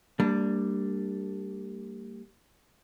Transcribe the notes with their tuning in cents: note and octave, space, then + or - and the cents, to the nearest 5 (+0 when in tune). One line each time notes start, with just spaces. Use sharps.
G3 +0 A#3 -40 D4 +0